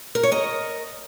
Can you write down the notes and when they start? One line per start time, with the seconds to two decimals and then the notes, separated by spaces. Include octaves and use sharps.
0.15 A#4
0.23 C#5
0.32 A#4 D#5